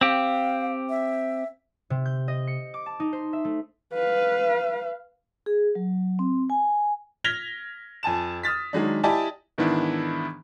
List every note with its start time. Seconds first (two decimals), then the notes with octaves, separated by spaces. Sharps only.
0.01 C4 G4 F5
0.90 E5
1.90 C3
2.06 G6
2.28 D#5
2.47 C#7
2.74 D6
2.86 A5
3.00 D#4
3.13 C5
3.33 E5
3.45 A3
3.94 B4 F5
5.46 G#4
5.75 F#3
6.19 C4
6.50 G#5
7.24 F6 G#6 A#6 B6 F7 G7
8.03 F2 G#5 A5 E7
8.43 D#6 F6 A6 B6
8.73 D#3 F#3 G#3 D4
9.04 E4 G4 D5 D#5 G#5 A5
9.58 G#2 D#3 E3 B3 D4 E4